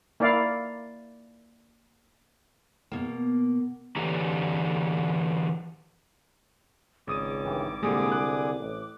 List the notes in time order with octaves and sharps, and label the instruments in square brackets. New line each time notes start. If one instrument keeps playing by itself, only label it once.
[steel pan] A#3 E4 D5 F5
[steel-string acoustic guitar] B2 A#3
[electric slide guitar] D3 E3 D4 G4 A#5
[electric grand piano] G#1 D#6 D#7 [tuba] C#2 [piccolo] D6
[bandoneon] G2 D#3 E3
[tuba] C2 [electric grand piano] A#2 G3 G#3 [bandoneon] D3 G#4 D#6
[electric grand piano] F#6
[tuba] A1